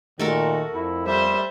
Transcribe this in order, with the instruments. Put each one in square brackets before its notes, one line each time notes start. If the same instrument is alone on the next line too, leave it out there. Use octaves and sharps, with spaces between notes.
[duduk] A#2 [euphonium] D#3 [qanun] A3 A4 A#4 [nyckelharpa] F#4
[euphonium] F2 [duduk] E4
[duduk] G3 [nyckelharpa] C5 E5